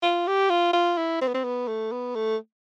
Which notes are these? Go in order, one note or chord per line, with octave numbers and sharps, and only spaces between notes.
F4
G4
F4
F4
E4
C4
B3
C4
B3
A3
B3
A3